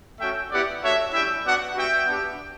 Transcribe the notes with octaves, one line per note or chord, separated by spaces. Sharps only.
A3 C#4 F#4 E5 G5
B3 E4 G4 D5 F#5
A3 D4 F#4 C#5 E5
G3 C#4 E4 E5 G5
B3 D4 F#4 D5 F#5
G3 B3 F#4 E5 G5
B3 D4 G4